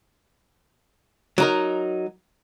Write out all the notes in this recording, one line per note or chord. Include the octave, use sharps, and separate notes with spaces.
F#3 D#4 A#4